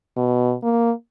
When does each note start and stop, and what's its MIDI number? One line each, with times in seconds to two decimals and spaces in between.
0.17 0.54 47
0.63 0.92 58